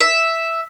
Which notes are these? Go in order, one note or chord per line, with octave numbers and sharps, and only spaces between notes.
E5